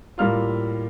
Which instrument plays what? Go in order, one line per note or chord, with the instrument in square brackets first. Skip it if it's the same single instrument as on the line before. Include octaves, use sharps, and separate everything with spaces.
[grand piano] A2 G3 A#3 F4 F6